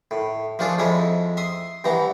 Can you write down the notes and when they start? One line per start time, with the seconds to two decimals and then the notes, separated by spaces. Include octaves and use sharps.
0.11 A2
0.59 F3 A3 D4 F4 G#4 A4
0.79 F2 G#3 E4 C#5 D#6
1.37 E5 C6 D#6
1.84 G2 E3 B3 A#5